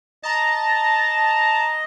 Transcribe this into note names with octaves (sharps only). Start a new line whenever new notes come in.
D#5 A5 A#5